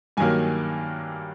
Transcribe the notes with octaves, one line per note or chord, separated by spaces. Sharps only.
G2 D#3 F#3 A#3 G#5